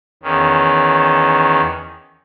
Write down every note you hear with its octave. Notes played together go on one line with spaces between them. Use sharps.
E2 D#3 C#4